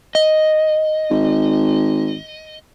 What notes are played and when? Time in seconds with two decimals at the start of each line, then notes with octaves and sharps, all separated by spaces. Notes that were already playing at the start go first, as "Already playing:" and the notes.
0.15 D#5
1.10 G#1